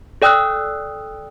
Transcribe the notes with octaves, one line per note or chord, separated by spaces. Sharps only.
A4 D5 G5 D#6 E6 F#6